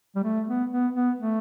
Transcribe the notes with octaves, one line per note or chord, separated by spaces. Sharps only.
G3
A3
B3
B3
B3
A3